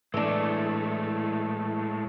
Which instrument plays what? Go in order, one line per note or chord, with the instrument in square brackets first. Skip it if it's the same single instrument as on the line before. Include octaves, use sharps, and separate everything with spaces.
[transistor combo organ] A2 [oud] E3 D4 [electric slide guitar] G#3 A3